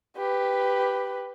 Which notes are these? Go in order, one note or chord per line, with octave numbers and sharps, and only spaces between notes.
G4 B4